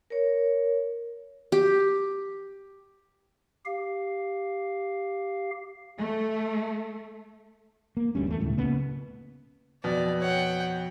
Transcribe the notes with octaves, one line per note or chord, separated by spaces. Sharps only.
A#4 C#5
G4
G4 F5
A3
A#3
G1 D2 G3 C#4
E2 A3
D#1 C#2 A2
C#3 A#3 B3
F2 B2 B3 D5
C#5 F#5 G5